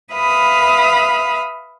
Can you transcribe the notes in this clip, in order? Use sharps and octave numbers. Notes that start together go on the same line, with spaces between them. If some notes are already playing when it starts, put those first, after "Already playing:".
B4 E5 F5 B5 D#6